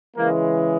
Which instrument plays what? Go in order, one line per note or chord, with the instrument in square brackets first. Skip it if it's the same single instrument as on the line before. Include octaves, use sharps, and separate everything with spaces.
[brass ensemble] C#3 E3 G#3 A#3